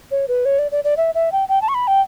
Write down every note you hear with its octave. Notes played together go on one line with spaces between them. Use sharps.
C#5
B4
C#5
D5
D5
D5
E5
E5
G5
G5
A5
C#6
B5
G5